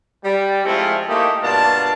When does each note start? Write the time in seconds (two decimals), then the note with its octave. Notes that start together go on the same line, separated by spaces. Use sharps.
0.24 G3
0.66 F3 G#3 A3 C4 E4 F4
1.09 A3 A#3 D#4 E4 G4
1.42 G2 B2 A#3 D4 F4 A5